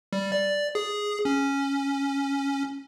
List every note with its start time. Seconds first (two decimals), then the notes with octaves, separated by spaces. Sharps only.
0.13 G3
0.32 D5
0.75 G#4
1.25 C#4